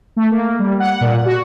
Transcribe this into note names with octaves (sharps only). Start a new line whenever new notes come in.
A3
A#3
G3
F#5
A#2
F#4